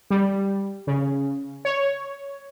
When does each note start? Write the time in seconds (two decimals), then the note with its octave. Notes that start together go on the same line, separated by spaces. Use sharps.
0.10 G3
0.87 C#3
1.65 C#5